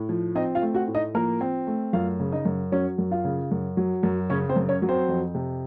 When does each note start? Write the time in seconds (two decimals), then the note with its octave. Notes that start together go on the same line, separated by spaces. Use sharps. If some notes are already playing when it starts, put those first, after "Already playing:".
Already playing: A2
0.09 F3
0.35 C4 D#4 D#5
0.55 F4 F5
0.62 A3
0.74 F#4 F#5
0.88 A2
0.95 D#4 D#5
1.14 F3 A#3 A#4
1.41 C4
1.67 A3
1.93 F#2 F4 F5
2.20 C#3
2.32 D#4 D#5
2.45 F#2
2.72 F#3 C#4 C#5
2.98 F#2
3.11 F4 F5
3.25 C#3
3.51 F#2
3.77 F#3
4.03 F#2
4.30 C#3 C#4 C#5
4.49 C4 C5
4.56 F#2
4.69 C#4 C#5
4.82 F#3
4.89 C4 C5
5.08 F2
5.35 C3